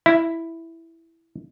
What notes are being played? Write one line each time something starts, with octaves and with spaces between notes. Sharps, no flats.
E4